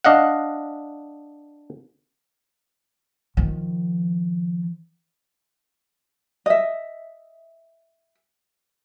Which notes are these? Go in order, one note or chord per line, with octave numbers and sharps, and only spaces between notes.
D4 D#5 F5 F#5
D#3 F3
D#5 E5